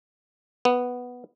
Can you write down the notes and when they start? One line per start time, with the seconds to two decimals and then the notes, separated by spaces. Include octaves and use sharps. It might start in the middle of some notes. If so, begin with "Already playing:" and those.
0.65 B3